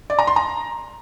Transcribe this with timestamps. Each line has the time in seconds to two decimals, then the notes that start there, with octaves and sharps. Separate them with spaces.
0.10 D5
0.19 A#5
0.27 C6
0.36 A#5